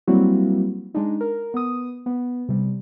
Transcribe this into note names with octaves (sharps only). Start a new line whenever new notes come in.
F#3 G3 A#3 C4 E4 F#4
G#3 D4 D#4
A#4
B3 D#6
B3
C3 G3